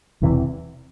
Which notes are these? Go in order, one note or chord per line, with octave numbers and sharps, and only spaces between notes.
E1 E2 C3 E3